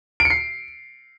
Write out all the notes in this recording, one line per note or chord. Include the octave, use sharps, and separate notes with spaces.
D7
C#7
C7